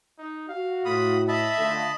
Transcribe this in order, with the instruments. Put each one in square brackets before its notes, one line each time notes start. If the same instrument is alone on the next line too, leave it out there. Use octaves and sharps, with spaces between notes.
[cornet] D#4
[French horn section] F#4 [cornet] F5
[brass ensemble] A2 [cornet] F4 [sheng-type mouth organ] B5 D#6
[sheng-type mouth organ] D#5 A5 B5 [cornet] E5
[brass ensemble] D3 A3 [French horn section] F4